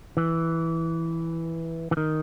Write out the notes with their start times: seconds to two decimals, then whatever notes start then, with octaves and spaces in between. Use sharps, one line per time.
0.17 E3
1.91 E3
1.97 D#3